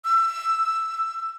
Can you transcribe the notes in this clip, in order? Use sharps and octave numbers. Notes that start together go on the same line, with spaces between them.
E6